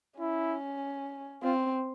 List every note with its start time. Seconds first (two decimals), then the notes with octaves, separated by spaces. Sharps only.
0.19 C#4 E4
1.43 C4 F4